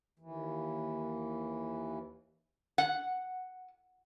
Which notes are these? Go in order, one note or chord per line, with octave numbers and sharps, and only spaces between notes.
D#2 E3
F#5